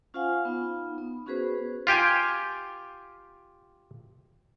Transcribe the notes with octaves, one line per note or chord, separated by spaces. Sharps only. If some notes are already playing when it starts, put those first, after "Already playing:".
C#4 F4 C5 F5 F#5 G#5
B3 D#4 F4
B3
B3 C#4 F#4 G#4 B4 C5
F4 G4 G5 G#5